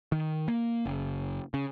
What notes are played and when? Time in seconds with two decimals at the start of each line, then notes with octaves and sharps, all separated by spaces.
0.12 D#3
0.48 A#3
0.86 F#1
1.54 C#3